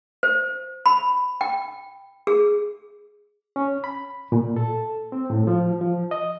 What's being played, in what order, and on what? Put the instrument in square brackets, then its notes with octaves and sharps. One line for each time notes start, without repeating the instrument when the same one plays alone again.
[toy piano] C5
B5
G5
G#4
[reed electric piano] C#4
B5
A#2
A4
C4
A2
F3
F3
D#5